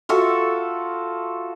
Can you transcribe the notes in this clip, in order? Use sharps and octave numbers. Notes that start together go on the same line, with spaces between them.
F4 F#4 A4 E5